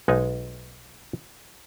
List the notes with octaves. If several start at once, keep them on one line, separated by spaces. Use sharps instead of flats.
B1 G#3 D#4 B4 G#5